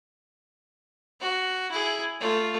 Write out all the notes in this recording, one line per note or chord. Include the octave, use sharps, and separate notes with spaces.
F#4
E4 G#4
A3 F4